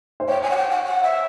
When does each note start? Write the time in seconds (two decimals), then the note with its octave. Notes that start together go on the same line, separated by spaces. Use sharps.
0.20 C5
0.28 C#5 G5
0.42 G#5
0.50 F#5
0.56 G5
0.69 F#5
0.84 F#5
1.02 E5